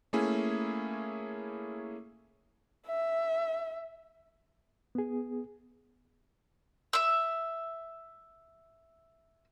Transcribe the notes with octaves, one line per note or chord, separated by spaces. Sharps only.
A3 A#3 C#4 E4 G#4
E5
B3 G#4
E5 E6